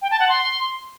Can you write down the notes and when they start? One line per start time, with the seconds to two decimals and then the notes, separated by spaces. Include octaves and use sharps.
0.02 G5
0.11 A5
0.20 F#5
0.29 C6